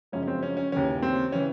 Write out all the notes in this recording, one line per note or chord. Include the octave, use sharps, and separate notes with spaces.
F#2 C#3 F3 G#3 C#4
C#4
C4
C#4
C#4
D#2 C#3 E3 C#4
C4
C#3 E3 C#4